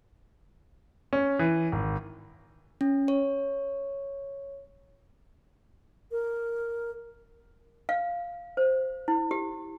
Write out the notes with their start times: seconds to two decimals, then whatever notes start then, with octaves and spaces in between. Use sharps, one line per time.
1.13 C#4
1.39 E3
1.72 G#1
2.81 C#4
3.08 C#5
6.11 A#4
7.89 F5
8.57 C5
9.08 E4
9.31 G4